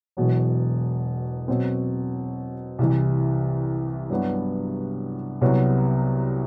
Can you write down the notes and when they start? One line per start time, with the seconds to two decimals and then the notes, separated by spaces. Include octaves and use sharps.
0.17 E1 E2 B2 F#3
1.48 B2 F#3 C4
2.79 C2 C3 E3
4.10 G2 F#3 B3 F#4
5.41 C2 C3 F#3 B3 F#4